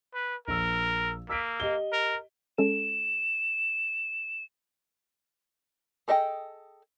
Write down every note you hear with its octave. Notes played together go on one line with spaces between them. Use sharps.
B4
A#1 A#4 E6
A#3 E6 B6 D7
G4 D#5 G7
A#4
G#3 C#4 A4 E7
G#4 A4 D#5 E5 G5